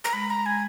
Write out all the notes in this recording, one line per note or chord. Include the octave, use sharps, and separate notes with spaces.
A#5
G#3 B5
A#5
G#3
G#5